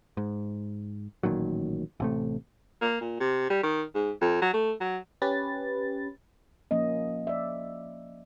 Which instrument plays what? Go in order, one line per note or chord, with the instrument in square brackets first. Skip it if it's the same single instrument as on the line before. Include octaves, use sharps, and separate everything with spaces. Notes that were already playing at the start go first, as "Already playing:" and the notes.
[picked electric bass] G#2
A1 A#2 D#3 F#3
A1 C3 A3
[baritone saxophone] A#3
A#2
C3
G3
D#3
G#2
F2
F#3
A3
F#3
[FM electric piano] C#4 G4 B4 A6
[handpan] F3 A#3 C#4 D#5
D5 E5